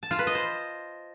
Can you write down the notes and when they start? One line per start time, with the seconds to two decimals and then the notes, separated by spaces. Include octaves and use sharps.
0.03 A5
0.11 F4
0.19 B4
0.27 D#5
0.35 C5